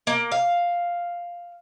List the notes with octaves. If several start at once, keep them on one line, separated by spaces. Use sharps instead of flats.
A#3
F5